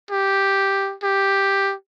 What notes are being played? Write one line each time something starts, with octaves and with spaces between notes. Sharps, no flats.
G4
G4